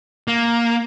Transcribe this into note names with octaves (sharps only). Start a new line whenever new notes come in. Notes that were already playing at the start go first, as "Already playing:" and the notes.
A#3